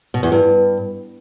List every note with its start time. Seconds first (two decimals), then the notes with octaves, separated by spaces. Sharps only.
0.14 B2
0.23 E2
0.32 G2